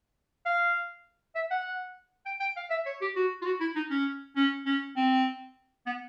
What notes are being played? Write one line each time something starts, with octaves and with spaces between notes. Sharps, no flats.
F5
E5
F#5
G5
G5
F5
E5
C#5
G4
F#4
F4
F#4
E4
D#4
C#4
C#4
C#4
C4
B3